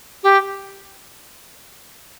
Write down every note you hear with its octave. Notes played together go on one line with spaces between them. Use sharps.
G4